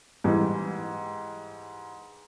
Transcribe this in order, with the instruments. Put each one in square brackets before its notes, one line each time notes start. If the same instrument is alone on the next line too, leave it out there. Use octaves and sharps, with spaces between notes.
[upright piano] G#2 E3 G3